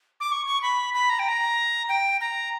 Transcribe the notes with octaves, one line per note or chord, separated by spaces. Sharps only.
D6
C#6
C#6
B5
B5
A#5
G5
A#5
G5
A#5